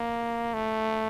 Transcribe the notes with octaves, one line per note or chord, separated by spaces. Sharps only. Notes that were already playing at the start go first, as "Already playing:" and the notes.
Already playing: A#3
A3